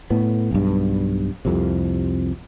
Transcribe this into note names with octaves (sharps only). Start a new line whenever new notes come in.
A2 B3
B1 G2
C2 F2 C3